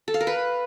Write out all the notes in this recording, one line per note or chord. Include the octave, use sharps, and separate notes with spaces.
A4
F5
A#4
B4